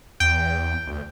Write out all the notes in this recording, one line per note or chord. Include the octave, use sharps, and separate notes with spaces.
E2 G5
D2